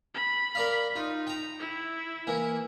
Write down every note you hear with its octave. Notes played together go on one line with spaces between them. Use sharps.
B5
A#4 D5 F5
D#4 F4
G5 A#5
E4
E3 A#3